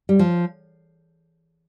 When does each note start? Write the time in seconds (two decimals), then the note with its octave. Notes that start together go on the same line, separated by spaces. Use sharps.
0.09 G3
0.19 F3